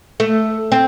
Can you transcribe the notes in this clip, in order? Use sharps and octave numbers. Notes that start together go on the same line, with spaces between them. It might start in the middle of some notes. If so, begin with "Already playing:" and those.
A3
C4